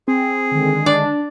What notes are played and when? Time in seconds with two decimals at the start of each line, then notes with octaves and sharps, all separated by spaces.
0.08 C4 G#4
0.51 D3 D#3 G#3
0.86 D4 D5